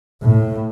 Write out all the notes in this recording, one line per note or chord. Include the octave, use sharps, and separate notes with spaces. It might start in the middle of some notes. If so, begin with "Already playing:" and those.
A2